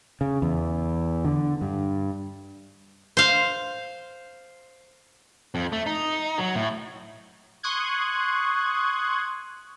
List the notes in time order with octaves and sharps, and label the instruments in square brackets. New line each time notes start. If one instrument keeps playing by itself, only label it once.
[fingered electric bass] C#3
E2
D3
G2
[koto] C5 F5
[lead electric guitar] F2
A3
D#4
F#3
A2
[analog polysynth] C6 C#6 D#6 F#6 G#6